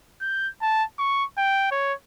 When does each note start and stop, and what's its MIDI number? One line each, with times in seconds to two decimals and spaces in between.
0.21 0.49 91
0.62 0.84 81
0.98 1.24 85
1.38 1.69 79
1.72 1.93 73